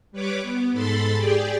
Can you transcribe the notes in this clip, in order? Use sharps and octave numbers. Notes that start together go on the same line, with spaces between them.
G3 B4 C#5 D6
B3
G#2 A4 B5 C6 A6
G4 G#4 D5 G5